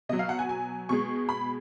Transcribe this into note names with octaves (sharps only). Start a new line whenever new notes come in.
B2 F#3 D#5
F5
F#5
G#5
G#5
B2 G#3 C#6
B5